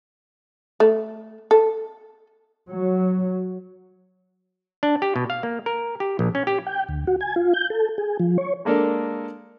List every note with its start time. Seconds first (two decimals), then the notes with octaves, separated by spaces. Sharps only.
0.80 A3
1.51 A4
2.69 F#3
4.83 D4
5.02 G4
5.16 B2
5.30 F5
5.43 A#3
5.66 A#4
6.00 G4
6.19 A#1
6.35 C#4
6.47 G4
6.66 G5
6.89 D2
7.07 F#4
7.21 G#5
7.36 F4
7.54 G6
7.70 A4
7.98 G#4
8.20 F3
8.38 C#5
8.65 G#3 A#3 D4 A4 A#4